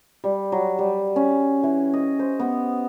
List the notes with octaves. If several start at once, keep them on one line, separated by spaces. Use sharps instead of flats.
G3
F#3
G3
C#4
E3
D#5
C5
B3